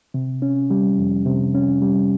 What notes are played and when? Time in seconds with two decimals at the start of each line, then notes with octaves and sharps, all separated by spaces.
0.14 C3
0.42 C#4
0.70 G3
0.99 F2
1.26 C3
1.55 C#4
1.82 G3